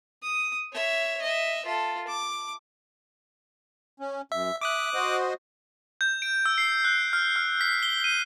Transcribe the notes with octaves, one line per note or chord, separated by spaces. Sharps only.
D#6
C#5 E5
D#5 E5
F4 A4
D6
C#4
F#2 E5
E5 D6 D#6 F#6
F#4 C5 D#5
G6
D7
E6
C7
F#6
F6
F6
B6
G7
D#7